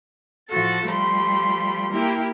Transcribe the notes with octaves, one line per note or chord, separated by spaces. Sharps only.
A2 F3 F#4 A4 A6
F3 G3 A3 B5 C6
A#3 E4 G4 A#4